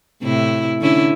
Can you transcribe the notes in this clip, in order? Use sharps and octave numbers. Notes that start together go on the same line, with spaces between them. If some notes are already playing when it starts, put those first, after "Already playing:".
A2 C3 E4
D3 C#4 E4